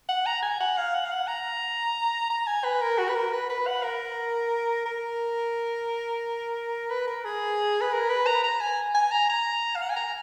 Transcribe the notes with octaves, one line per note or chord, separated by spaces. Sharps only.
F#5
A#5
G#5
F#5
F5
F#5
F5
F#5
A#5
A#5
G#5
B4
A#4
F#4
B4
A#4
B4
B4
F#5
A#4
A#4
B4
A#4
G#4
B4
A#4
B4
A#5
A#5
G#5
G#5
A#5
A#5
F5
F#5
G#5
A#5